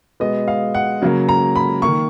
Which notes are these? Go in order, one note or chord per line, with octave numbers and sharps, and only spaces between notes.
B2 G#3 B3 D#5
F5
F#5
C#3 F#3 A#3
A#5
B5
D#3 A#3 C#6